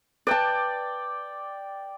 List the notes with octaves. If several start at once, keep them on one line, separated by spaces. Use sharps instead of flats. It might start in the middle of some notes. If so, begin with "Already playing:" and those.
B4 D5 G5 A5